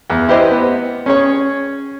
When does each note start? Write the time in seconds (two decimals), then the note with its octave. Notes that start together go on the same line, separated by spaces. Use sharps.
0.10 E2
0.29 E4 G4 B4 C5 D#5
0.51 B3
1.06 C#4 G#4 C#5